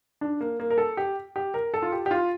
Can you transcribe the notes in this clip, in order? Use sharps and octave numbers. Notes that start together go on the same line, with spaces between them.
D4
A#3
A#3
A#4
A4
G4
G4
A#4
A4
F4
G4
G4
F4